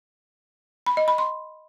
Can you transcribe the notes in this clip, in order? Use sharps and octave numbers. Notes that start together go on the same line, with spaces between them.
B5
D#5
B5
C6